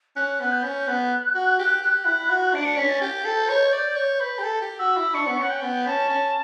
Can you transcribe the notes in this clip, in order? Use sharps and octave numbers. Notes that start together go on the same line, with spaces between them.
C#4 F#6
B3
G6
C#4
G6
B3 F#6
F#4
G4
G4
E4
F#4
D4 D7
C#7
C#4 B6
A6
G4 G6
A4
C#5
D5
C#5
B4
G4
A4
G4
F#4 E6
E4
D4 C#6
B3
C#4 F#5
G5
B3
C#4 A5
C#4